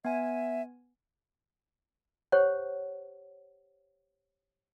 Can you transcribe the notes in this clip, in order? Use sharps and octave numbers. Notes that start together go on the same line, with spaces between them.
B3 E5 G#5
G4 C5 C#5 F#5